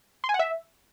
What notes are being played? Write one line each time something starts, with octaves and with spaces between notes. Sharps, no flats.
C6
G#5
F#5
E5